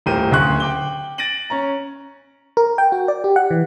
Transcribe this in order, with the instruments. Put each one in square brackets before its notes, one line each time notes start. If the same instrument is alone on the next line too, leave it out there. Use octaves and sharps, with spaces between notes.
[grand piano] D#1 A2 G4 A#4 C5 D#7
D1 D2 C#3 C6 C#6 F#6
G5 D6 G7
A6 A#6 D7 D#7 F#7
C#4 A#5
[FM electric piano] A#4
G5
F#4
D5
G4
F#5
E3